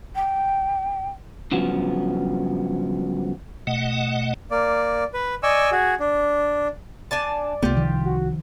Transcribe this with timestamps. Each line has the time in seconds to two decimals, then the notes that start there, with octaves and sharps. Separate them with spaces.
0.15 G5
1.52 G2 C#3 F3 F#3 B3
3.67 B2 A3 D#5 F#5
4.51 A#3 D5
5.14 B4
5.43 D5 D#5 G#5 C#6 E6
5.72 F#4 G#4
6.00 D4
7.11 D4 D5 G#5 A5
7.63 C2 A3 B3 F4 G4
7.76 D#3 F3
8.05 F#4